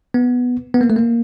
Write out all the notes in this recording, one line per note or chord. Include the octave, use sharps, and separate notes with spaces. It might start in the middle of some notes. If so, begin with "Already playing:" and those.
B3
B3
A#3
A3
A#3